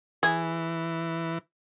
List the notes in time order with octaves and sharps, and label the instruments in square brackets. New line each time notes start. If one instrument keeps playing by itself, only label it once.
[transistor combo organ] E3 [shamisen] G#4